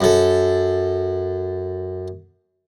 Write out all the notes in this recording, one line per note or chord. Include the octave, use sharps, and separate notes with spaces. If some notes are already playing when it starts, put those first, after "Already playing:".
F#2 A4